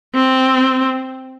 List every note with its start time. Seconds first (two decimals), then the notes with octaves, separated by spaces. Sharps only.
0.15 C4